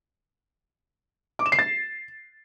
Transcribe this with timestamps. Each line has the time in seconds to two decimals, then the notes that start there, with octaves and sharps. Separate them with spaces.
1.39 D6
1.46 E7
1.52 C7
1.59 A6